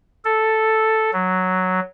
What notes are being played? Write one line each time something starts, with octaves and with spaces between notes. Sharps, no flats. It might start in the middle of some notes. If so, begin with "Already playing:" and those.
A4
F#3